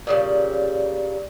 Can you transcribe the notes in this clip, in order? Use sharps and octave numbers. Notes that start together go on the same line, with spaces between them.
A#2 C#3 G3